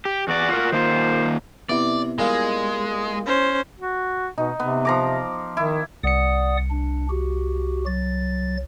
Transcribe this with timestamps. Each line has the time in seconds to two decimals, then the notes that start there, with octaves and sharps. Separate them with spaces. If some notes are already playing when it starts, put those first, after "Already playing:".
0.05 G4
0.28 E2 F#4 D5
0.49 F4 A#4
0.72 D#3 A#3 F4 C5
1.69 C3 B3 E4 D5
2.19 A#2 G3 G#3 F4
3.26 C#4 C5
3.80 F#4
4.38 B2 D#4
4.60 C3 B3
4.85 F3 A#5 D6
5.57 D#3 E4
6.04 C2 D5 F#5 D#6 C#7
6.70 D4
7.09 F#4 G4
7.86 F#3 A6